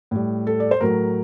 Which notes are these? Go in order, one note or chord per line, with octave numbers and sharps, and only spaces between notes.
A2 G3
A4
D5
C5
A2 F#3 A3 A#4